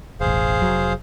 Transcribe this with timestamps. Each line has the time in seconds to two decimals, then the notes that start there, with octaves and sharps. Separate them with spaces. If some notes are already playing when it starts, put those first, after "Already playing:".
0.21 E1 A1 G#4 C5 F5
0.60 F1 F#3